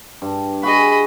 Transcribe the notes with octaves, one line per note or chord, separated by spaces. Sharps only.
G2
F#4 G#4 D#5 B5